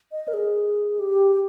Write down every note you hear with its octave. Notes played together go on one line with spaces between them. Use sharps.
D#5
A#4
G#4
G4